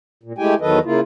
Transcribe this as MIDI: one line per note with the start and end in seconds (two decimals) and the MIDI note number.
0.23 0.33 46
0.38 0.54 56
0.38 0.54 57
0.38 0.54 64
0.38 0.54 67
0.38 0.54 79
0.38 0.54 80
0.61 0.79 40
0.61 0.79 51
0.61 0.79 54
0.61 0.79 69
0.61 0.79 71
0.61 0.79 75
0.85 1.00 49
0.85 1.00 58
0.85 1.00 64
0.85 1.00 65